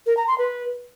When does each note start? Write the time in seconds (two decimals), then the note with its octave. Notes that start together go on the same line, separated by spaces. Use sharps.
0.06 A#4
0.17 A#5
0.27 C6
0.38 B4